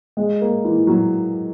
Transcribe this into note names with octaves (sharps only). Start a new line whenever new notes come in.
G#3
A#3
E3
F#3